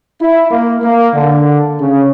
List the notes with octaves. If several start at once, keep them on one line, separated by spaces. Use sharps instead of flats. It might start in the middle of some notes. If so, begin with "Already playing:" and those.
E4
A#3
A#3
D3
C#3